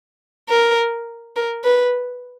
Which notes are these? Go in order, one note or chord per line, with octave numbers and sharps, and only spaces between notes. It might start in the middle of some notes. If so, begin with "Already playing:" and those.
A#4
A#4
B4